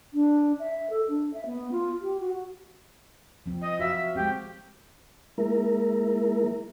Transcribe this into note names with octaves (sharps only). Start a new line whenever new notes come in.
D4
E5
A4
D4
E5
B3
F4
G4
F#4
F3 C4
D#5
F#4 E5 F5
G#3 C4 G4
G#3 A#3 E4 A#4